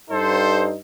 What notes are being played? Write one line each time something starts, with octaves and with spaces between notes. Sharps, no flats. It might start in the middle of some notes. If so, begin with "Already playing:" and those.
G2 D#4 A4 C5